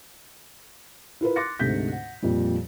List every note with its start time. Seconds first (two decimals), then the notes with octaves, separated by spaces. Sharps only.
1.21 E4 F4 A#4 B4
1.36 C6 D6 F#6 A6 A#6 C#7
1.59 D2 G#2 C3 A3 G6 B6
1.92 F#5
2.22 F2 A#2 F3 G3